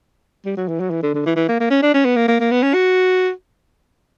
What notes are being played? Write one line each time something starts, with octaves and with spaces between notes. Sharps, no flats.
G3
F#3
E3
F#3
E3
D3
D3
E3
E3
A#3
A#3
C#4
D4
C#4
B3
A#3
A#3
A#3
B3
C#4
F#4